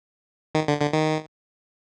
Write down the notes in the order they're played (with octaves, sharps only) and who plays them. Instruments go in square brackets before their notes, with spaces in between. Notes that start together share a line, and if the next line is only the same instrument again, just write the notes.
[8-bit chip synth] D#3
D3
D3
D#3